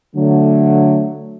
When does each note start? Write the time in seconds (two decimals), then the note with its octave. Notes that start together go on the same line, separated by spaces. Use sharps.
0.15 D3 F#3 A3